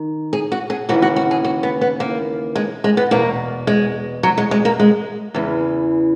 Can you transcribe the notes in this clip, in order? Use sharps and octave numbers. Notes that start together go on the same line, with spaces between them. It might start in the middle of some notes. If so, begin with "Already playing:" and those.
Already playing: D#3
G#4
F#4
G#4
D#2 C#3 E3 F#4
F#4
F#4
G#4
F#4
B3
B3
A#3
G#3
G#3
B3
E2 B2 A#3
G#3
F#3
G#3
G#3
A#3
G#3
E2 C#3 E3